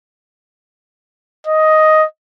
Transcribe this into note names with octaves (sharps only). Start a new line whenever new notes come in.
D#5